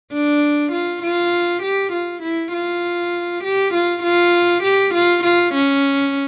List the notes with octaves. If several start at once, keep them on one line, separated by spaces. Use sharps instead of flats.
D4
F4
F4
G4
F4
E4
F4
G4
F4
F4
G4
F4
F4
C#4